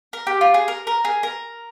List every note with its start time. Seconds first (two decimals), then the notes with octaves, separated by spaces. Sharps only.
0.13 A#4
0.27 G4
0.41 F4
0.54 G#4
0.68 A#4
0.87 A#4
1.05 G#4
1.23 A#4